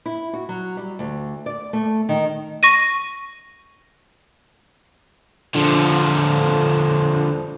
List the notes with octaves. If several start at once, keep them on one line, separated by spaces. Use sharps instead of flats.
E4
F#4
F#3
G3
D2
D5
A3
D#3
C#6 A#6 D#7
D3 F3